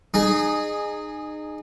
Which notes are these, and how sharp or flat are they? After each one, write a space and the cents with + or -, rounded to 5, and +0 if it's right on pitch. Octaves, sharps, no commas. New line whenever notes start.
D#4 -30 G#4 +0